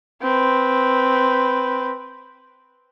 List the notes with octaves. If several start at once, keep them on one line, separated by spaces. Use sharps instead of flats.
C4 B4